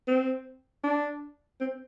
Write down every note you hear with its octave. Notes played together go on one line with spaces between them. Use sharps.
C4
D4
C4